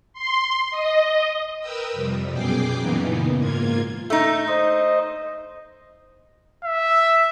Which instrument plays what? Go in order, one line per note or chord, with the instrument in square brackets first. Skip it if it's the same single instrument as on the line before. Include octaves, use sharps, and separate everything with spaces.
[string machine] C6
D#5
A#4 B4 G5 D#6 E6
F2 C3 G3
F#2 B2 G#4 G5 D6 C7
F#2 A#2 C#3 E3 B3 D#4
G#2 A#3 F4 G#6
[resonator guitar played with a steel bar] A3 D#4
[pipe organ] C5 D#5
[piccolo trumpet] E5